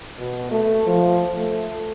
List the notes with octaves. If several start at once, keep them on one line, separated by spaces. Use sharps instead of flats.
B2
A3
F3
A3